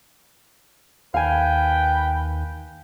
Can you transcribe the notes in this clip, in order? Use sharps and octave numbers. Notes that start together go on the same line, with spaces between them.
D#2 B4 F5 G5 G#5